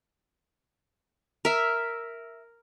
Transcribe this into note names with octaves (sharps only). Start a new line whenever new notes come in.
A#4 E5